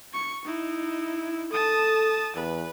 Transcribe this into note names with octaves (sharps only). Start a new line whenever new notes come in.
C#6 C#7
D#4 E4
A4 A5 D#6
E2 B4